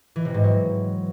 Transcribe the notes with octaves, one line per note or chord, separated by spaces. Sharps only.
E3
C3
G#2
F#3